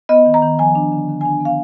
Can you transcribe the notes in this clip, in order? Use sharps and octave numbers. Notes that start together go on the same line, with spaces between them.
B3 D#5
D#3
A#5
D#3
F3 G#5
D4
D3
D3
G#5
D4
B3 F5